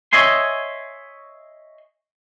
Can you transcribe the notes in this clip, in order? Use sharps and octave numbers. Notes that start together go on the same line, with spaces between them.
C#5 D#5 E5 G#5 C6